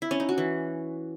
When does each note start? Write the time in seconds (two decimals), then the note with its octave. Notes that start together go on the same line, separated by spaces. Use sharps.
0.02 E4
0.11 C#4
0.20 D#4
0.29 F#4
0.38 E3